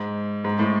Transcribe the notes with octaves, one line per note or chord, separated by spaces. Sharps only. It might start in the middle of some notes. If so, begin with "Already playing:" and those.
Already playing: G#2
G#2
A2